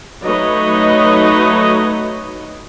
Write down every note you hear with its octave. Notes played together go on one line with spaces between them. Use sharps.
F#3 A3 D#4 B4 C#5 D#5